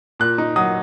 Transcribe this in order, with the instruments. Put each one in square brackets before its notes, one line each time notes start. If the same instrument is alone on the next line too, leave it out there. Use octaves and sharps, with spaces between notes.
[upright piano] A#2 F#6
D#4
F#3 D#6